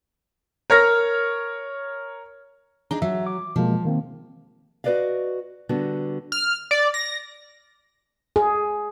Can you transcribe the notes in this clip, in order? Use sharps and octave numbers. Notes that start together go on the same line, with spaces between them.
A#4 C#5 F6 A#6
D4 D#4 G#4 A#5
F#3 E5
D6
B2 F3 G#3 A#3
D#3 A#3 C4
F#4 A4 B4 D5 D#5 F5
D3 G3 B3 F#4
F6
D5
A#6
G#4